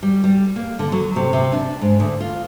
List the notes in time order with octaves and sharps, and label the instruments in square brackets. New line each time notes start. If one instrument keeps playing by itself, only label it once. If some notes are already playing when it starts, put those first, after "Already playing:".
[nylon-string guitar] G3
G3
A#3
D3
F#3
C3
C3
D4
G#2
D2
F4